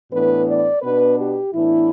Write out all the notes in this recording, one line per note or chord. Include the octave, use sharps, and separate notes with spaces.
A2 E3 B3 D4 B4
D5
B2 B3 D4 B4
G4
A2 E3 B3 D4 E4